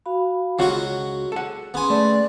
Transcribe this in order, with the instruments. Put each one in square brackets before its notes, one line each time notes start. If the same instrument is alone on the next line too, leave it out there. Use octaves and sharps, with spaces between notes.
[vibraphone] F#4 F5 B5
[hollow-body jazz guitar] C#2 F4 F#5 [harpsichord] F#3 F#4 [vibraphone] G#4
[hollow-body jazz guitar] A4 F#5
[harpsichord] B3 G#5 [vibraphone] C#4 G#4 C6
[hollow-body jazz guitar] A3 [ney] D5